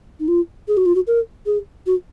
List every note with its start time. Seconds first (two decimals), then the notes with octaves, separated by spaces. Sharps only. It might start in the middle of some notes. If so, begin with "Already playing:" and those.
0.20 D#4
0.28 F4
0.68 G#4
0.77 F#4
0.86 F4
0.95 F#4
1.07 A#4
1.46 G#4
1.86 F#4